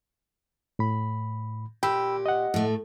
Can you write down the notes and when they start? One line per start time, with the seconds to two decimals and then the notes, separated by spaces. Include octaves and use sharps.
0.79 A2 B5
1.83 A#2 G4 G5 B5 E6
2.26 D#5 F#5
2.54 A2 A3